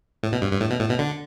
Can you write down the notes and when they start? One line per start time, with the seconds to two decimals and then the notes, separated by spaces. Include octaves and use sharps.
0.23 A2
0.32 B2
0.42 G2
0.52 G2
0.61 A2
0.70 B2
0.81 A2
0.90 B2
0.99 D3